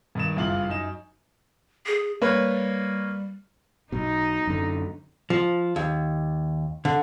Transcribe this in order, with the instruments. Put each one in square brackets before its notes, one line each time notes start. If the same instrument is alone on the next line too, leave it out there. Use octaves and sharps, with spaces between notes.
[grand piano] G2 D#3 E7
F#1 C2 G2 F4 F5 F#7
F#2 D#4 E7
[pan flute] G#4
[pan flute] G3 [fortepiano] A#3 B4 C#5
[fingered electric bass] B1 B2 [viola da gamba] D#4
[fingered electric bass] F#2 D3
[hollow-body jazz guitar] F3
D#2
D3